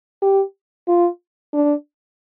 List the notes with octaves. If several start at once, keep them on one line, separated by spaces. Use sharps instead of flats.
G4
F4
D4